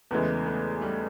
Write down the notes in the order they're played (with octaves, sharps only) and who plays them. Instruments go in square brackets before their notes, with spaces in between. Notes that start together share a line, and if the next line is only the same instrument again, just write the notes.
[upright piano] E2 C#3 E3 G#3 [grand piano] A3 B3
[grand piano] A3 B3
G3 A3